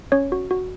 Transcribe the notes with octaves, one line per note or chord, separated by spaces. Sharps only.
C#4 C#5
F#4
F#4